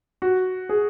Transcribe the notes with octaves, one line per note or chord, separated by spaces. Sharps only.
F#4
G#4